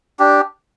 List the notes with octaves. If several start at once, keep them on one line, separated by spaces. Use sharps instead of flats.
D4 G4